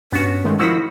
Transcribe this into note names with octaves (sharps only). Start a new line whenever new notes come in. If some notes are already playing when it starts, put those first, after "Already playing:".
G2 B3 C#4 F#4
D#3 G#3 A3
D#3 F3 E4 F#4 E6 A#6 B6